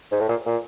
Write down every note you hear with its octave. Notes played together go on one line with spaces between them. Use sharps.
G#2
A2
A#2
A#2